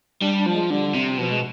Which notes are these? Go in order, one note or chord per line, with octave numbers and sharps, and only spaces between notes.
G3 D4
D4
F3
G#3
D3 G3
C3
B2 F3
G#3